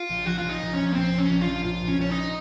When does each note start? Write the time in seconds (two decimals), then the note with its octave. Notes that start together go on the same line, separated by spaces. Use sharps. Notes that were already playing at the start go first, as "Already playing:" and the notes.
Already playing: F4
0.09 A#1
0.25 F3 F#4
0.38 F4
0.44 A#1
0.49 D#4
0.61 A#1
0.73 A#1 C#4
0.92 A#3
0.95 A#2 C4
1.12 A#2
1.18 C#4
1.30 A#1
1.41 F4
1.47 F3
1.64 A#2 F4
1.82 A#2
1.88 C#4
1.99 A#1 C#4
2.10 D#4